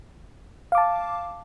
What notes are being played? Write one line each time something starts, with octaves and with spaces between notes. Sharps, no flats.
F5 A5 D6